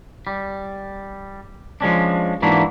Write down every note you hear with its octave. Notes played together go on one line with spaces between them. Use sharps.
G3
F3 G#3 C#4 D4
G#2 E3 A#3 D4 E4 F#4